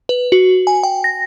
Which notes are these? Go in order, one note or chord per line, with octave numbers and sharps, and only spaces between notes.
B4
F#4
G#5
G5
A#6